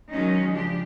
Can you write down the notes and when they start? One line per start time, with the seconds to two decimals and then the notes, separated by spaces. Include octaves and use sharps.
0.12 D#3 F#3 G#3 C#4 D#4
0.51 C#3 F3 D4 G4